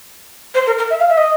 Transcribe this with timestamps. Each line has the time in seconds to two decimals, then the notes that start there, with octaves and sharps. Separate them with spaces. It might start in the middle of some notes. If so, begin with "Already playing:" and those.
0.55 C5
0.67 A#4
0.78 A#4
0.90 E5
1.00 F5
1.09 E5
1.17 D#5